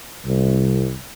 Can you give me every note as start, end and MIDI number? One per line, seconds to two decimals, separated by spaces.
0.25 0.92 36